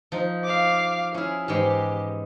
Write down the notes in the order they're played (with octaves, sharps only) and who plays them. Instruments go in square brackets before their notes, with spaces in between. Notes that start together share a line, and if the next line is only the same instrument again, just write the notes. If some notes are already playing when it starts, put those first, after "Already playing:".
[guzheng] F3 D#4
[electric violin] F5 D6
[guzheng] C#4 G#4 [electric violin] E4
[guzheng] G#2 E3 G#3 [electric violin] G4